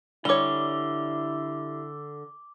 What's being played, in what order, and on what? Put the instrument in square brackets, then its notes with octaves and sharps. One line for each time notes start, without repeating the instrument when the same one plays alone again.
[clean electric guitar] D3 [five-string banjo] G3 C#5 [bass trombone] E4 [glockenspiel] D6 G7